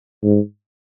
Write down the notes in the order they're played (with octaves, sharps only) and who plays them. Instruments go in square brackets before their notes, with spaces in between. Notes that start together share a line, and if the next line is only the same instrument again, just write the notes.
[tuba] G#2